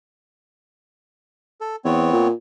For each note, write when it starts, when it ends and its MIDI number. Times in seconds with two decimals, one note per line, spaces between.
1.61 1.76 69
1.85 2.12 40
1.85 2.28 59
1.85 2.28 60
1.85 2.28 73
2.13 2.32 46